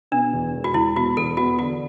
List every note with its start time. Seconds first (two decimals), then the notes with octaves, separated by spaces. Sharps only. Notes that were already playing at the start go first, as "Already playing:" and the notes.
0.12 B2 D4
0.33 E2
0.54 E1
0.64 F#4
0.74 E1 E4
0.96 B2 F#4
1.17 E2 A4
1.37 B3 F#4
1.59 D3 F#4